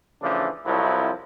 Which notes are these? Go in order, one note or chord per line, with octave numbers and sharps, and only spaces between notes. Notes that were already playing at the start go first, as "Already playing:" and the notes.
C#3 E3 F3 A3 D4
C2 F2 F3 F#3 E4